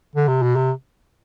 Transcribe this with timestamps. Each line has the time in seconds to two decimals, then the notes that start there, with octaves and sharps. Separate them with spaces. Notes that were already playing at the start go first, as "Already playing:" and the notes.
0.16 D3
0.28 C3
0.42 B2
0.56 C3